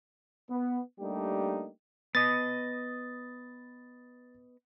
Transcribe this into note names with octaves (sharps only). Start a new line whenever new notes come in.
B3
G3 A3 A#3 D4 D#4 G4
B3 D#5 A6